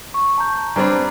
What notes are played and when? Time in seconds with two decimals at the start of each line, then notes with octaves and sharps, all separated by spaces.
0.14 C#6
0.38 A5 A#5 G6
0.76 G2 C4 D4 A#5 B5